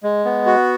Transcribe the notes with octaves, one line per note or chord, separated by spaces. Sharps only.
G#3
B3
F#4